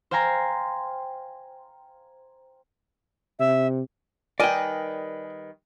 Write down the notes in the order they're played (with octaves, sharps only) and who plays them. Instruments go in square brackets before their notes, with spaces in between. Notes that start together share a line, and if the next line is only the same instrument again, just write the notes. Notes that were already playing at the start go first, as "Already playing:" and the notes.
[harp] C5 F5 G5 G#5 A#5 C6
[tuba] C3 [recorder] E5
[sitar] D#3 G3 B4 [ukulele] A#4 D#5 G#5 [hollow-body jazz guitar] D5 G5